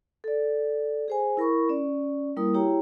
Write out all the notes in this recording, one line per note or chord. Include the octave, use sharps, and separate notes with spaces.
A4 D5
G#4 C5 G#5
E4 A#4 B5 C#6
C#4 D5
G3 A#3 E4 A#4 D#6
E4 F#4 G4 C#5 G5 A#5